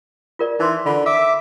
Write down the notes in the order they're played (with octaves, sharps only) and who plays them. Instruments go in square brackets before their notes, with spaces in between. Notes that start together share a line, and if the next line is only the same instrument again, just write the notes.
[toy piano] F4 A#4 D5
[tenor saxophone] E3 [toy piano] D#4 C6
[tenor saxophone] D3 [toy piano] F4 B5
[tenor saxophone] E5 [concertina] D6